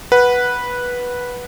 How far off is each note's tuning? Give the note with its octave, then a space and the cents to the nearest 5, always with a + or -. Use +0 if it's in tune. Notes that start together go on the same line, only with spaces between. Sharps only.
B4 -10 F#5 +0